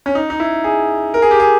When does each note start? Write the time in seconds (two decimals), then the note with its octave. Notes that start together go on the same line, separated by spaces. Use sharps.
0.06 C#4
0.15 D#4
0.30 D#4
0.40 E4
0.64 G#4
1.14 A#4
1.22 G#4
1.31 G4
1.40 G#4